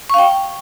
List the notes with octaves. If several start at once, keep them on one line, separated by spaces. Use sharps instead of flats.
F5 G5 C#6